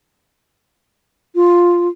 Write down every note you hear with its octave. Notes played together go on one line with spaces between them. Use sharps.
F4